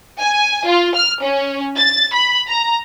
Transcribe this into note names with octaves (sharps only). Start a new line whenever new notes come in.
G#5
F4
F6
C#4
A6
B5
A#5